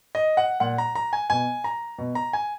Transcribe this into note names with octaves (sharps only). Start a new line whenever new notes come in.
D#5
F#5
A#2 F#5
A#5
A#5
G#5
B2 G#5
A#5
B2
A#5
G#5